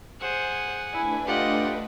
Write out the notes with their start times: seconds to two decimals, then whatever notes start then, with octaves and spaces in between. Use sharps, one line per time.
0.21 G#4 C5 F#5
0.92 A3 D4 E4 B4 G#5
1.27 F4 G4 D5 D#5 F#5